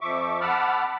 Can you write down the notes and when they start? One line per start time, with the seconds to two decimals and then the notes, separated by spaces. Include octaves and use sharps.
0.01 F2 F3 E5 C#6 D6
0.41 F#5 A5 B5 D6 E6 F6